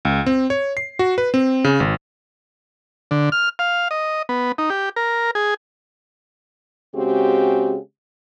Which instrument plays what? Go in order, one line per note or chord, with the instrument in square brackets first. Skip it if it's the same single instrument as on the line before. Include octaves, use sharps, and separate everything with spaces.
[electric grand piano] C#2
C4
C#5
C7
F#4
B4
C4
C#3
G#1
[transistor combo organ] D3
F6
F5
D#5
B3
D#4
G4
A#4
G#4
[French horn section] C#3 G#3 C4 F#4 G4